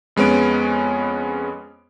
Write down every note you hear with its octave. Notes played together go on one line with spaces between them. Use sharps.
F2 G#3 B3 C#4 D7